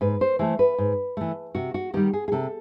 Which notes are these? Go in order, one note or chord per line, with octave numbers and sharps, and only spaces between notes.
G#2 B4
C5
E3 A3 C5
B4
G#2
E3 A3
C3 F#4
F#4
D#3 G3 G4
G#4
G#4
C3 A4